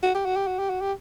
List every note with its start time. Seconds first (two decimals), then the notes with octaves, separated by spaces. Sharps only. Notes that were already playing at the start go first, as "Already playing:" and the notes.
0.02 F#4
0.15 G4
0.25 F#4
0.36 G4
0.47 F#4
0.59 G4
0.70 F#4
0.81 G4